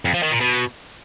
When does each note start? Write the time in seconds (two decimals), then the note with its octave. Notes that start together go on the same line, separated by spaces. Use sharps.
0.05 F2
0.14 F3
0.23 D#3
0.32 A#2
0.41 B2